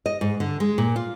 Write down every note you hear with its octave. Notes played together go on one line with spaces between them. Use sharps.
D#5
G#2
D3
G#3
A#2
F4